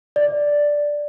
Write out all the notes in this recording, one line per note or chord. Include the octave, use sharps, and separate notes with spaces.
D5